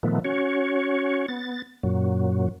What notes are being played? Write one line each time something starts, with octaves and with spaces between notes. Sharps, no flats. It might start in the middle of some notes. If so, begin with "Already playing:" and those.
A#2 D#3 F3 A3 B3
C#4 F#4 C#5
B3 A6
F#2 A#2 F#3